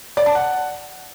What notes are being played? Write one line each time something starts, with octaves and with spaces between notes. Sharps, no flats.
D5
A5
F#5